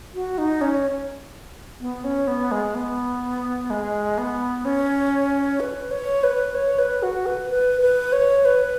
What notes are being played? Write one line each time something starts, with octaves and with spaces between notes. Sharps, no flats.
F#4
D#4
C#4
B3
C#4
B3
G#3
B3
G#3
B3
C#4
B4
C#5
B4
C#5
B4
F#4
B4
B4
B4
C#5
B4